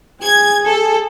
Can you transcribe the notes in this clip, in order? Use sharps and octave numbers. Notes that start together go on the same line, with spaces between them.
G#4 G#6
A4